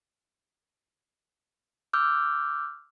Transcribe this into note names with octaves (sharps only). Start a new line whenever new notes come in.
D6 E6 F6 G6